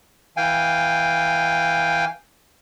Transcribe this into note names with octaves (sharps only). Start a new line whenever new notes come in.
E3 F5 G5 G#5